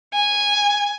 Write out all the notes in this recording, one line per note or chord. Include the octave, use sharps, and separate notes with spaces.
G#5